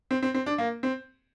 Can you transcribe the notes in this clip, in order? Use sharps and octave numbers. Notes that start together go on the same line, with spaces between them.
C4
C4
C4
D4
A#3
C4